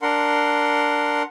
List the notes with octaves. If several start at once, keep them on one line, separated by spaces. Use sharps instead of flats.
D4 A#4 F#5 C6